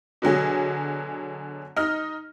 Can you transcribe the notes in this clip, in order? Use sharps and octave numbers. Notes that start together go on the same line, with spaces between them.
B2 D3 F#3 G#4
D#4 F6